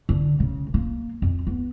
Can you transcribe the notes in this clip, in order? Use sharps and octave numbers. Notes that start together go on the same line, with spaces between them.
D3
C#3
A#3
F2
B3